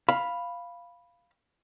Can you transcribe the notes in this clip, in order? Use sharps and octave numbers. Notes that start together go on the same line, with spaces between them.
F5 B5